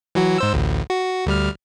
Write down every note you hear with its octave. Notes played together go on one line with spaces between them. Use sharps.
E3 F#3 F#4
G#2 C5 E6
A1 D2
F#4
D2 G3 F6